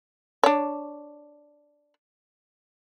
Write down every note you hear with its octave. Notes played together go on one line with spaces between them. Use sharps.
D4 C#5